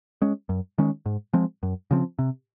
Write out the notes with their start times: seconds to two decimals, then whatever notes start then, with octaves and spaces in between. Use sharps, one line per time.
0.22 G#3 C#4
0.49 F#2
0.78 D#3 G#3 C#4
1.06 G#2
1.33 F3 G#3 C4
1.63 F#2
1.91 C#3 F3 C4
2.19 C3